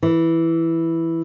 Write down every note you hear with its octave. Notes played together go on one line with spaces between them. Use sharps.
E3